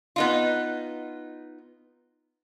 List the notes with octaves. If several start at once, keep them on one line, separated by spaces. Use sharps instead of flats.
B3 D#4 F4